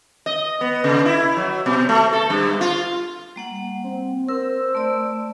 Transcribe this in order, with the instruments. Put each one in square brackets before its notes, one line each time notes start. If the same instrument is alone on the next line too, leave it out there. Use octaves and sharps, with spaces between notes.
[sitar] D#5
B3
C#3
E4
F#3
B2
A3
A4
G2
F4
[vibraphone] G3 A#3 F#5
[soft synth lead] C4
[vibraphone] A#4 [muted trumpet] C5 [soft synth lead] E6
[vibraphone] A3 D5